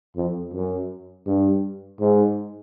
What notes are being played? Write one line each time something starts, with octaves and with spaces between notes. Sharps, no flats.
F2
F#2
G2
G#2